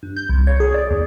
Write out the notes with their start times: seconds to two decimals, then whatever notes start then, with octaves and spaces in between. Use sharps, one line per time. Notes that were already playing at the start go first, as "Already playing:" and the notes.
0.03 G2
0.16 G6
0.29 C2
0.47 C#5
0.60 G#4
0.74 D5
0.90 D#2